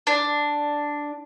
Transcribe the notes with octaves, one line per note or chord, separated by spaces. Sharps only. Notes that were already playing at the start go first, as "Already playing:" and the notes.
D4